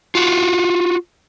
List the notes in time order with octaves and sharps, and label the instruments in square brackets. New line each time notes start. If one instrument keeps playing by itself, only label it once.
[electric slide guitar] F4 F#4